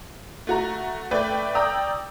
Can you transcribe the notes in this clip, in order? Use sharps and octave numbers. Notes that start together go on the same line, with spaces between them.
A3 F#4 A#5
A3 B4 D5 G5
D5 G5 A#5 D#6 E6